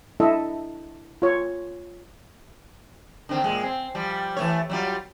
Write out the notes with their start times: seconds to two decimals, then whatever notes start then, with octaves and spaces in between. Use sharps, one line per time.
0.20 D4 E4 A4 D#5 E5
1.22 F4 C#5
3.29 D3 D#3 C4
3.44 A#2 C#3 G#3
3.63 C4
3.95 F3 G3
4.36 E3 A3 C#5
4.69 F#3 G3 F4